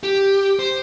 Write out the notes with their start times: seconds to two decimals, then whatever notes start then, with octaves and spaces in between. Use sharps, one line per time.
0.03 G4
0.59 C5